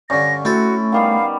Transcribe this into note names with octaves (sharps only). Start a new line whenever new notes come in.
G2 D3 C#4 A#6
A3 C4 E4 F#4 A4
D#3 G3 B3 F5